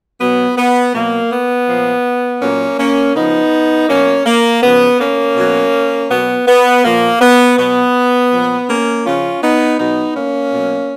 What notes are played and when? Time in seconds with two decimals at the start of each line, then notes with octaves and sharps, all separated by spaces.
0.20 B2 F#3 B3
0.57 B3
0.94 B2 F#3 A#3
1.30 B3
1.67 A#2 F3
2.41 A#2 F#3 A#3 C#4
2.78 A#3 C#4
3.14 C#3 F3 B3 D#4
3.89 B2 F#3 A#3 C#4
4.25 A#3
4.62 C#3 F3 B3
4.99 A#3 C#4
5.36 B2 F#3
6.10 B2 F#3 B3
6.47 B3
6.84 A#2 F3 A#3
7.21 B3
7.57 B2 F#3 B3
8.31 A#2 F3
8.68 A#3 C#4
9.05 C#3 F3 C#4 F4
9.42 B3 D#4
9.78 B2 F#3 B3 D#4
10.15 A#3 C#4
10.52 B2 F#3